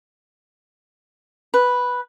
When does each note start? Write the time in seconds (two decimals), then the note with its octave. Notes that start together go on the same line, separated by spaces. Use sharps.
1.54 B4